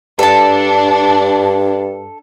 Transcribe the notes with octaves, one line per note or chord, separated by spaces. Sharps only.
G2 D4 A4 A5